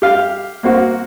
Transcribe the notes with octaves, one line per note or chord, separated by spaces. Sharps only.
G4 F5
A#3 C4 F#4